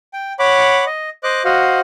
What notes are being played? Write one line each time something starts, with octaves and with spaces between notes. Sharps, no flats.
G5
C#5 F#5 B5 D6
D#5
C5 D#5 D6 F#6
F#4 C5 D#5 F5 F#5